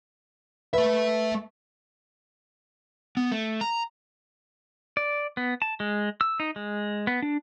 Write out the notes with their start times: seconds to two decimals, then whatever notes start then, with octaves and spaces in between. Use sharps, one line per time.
0.73 A3 B4 E5
3.17 B3
3.32 A3
3.61 A#5
4.97 D5
5.37 B3
5.62 A5
5.80 G#3
6.21 E6
6.40 D#4
6.56 G#3
7.07 B3
7.22 D4